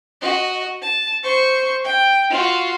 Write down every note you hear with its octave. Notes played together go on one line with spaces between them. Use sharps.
F#4 D#5
A5
C5 C#6
G5
F4 F#4